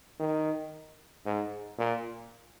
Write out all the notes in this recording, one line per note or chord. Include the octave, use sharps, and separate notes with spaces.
D#3
G#2
A#2